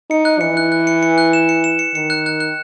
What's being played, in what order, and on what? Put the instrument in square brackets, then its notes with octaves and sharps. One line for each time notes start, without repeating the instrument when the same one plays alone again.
[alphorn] D#4 [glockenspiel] C#7
[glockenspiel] F#6
[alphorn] E3 [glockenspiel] C#7
[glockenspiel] F#6
F#6
C#7
C#7
F#6
E7
C#7
E7
C#7
[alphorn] D#3 [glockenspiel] C#7
[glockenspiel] F#6
F#6
F#6